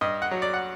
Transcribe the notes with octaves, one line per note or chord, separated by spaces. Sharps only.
G2 D#5
F#5
F#3
D5
F#5